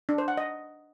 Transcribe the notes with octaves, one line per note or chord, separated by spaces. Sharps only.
D4
C5
F#5
D#5